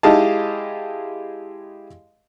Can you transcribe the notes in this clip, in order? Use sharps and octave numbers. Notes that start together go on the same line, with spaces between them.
G#3 E4 G4 D#5 F5 A5